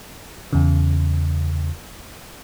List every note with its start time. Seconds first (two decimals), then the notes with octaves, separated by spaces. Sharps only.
0.53 E2 C#3